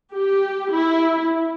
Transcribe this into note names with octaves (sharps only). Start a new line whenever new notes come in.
G4
E4